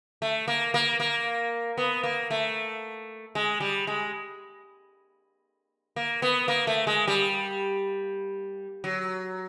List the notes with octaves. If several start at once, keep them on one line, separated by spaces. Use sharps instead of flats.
A3
A#3
A#3
A#3
B3
A#3
A3
G#3
G3
G#3
A#3
B3
A#3
A3
G#3
G3
F#3